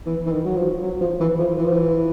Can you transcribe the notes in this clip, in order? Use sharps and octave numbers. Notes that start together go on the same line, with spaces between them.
E3
E3
D#3
F#3
F3
F#3
F3
E3
F3
E3
F3
E3